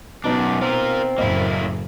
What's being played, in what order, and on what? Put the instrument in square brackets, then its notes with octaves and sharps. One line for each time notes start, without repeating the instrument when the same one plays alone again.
[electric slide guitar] F#2 D4 [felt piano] B2 B3 D#4
[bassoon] C4 [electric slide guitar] F4 A#4
[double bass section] F#1 A2 [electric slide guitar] A#3 E4 [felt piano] D#5